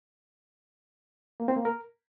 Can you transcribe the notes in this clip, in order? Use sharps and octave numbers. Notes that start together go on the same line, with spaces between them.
A#3
C4
A#3
A#4